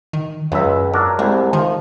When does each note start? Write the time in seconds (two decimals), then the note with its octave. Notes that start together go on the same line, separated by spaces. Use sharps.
0.13 D#3
0.52 C#2 F#2 E5
0.94 F#3 D4 A#4
1.19 C2 G#3
1.53 D#3 F3